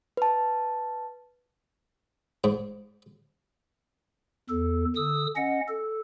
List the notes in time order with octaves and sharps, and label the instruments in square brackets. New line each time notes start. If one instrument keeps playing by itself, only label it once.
[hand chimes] B4 A5
[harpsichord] G#2
[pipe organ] E2 A4
D3 D#6 E6
C#4 D#5 F#5
A4